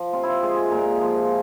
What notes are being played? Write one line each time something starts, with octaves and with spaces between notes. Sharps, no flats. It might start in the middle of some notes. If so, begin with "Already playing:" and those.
Already playing: F3
C3 F4
E4 F4
G#3 G#4
G#4
A#2 A#4
F3